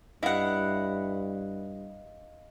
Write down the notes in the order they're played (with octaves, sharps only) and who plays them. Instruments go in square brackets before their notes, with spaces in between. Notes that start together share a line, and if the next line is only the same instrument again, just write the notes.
[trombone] G2 [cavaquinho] E4 F#5 [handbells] D#5 F5